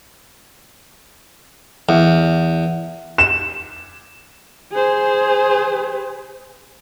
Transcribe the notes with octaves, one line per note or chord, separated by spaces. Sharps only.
E2
E7
G#4 C5